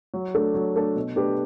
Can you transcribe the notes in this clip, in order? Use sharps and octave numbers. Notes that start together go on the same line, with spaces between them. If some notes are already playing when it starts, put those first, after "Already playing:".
F#3
A3 D4 A4
F#3
A3 D4 A4
B2
A3 D4 G4 B4